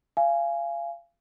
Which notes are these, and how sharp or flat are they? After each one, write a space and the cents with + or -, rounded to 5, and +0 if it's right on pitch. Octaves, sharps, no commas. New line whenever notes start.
F5 -30 G#5 +0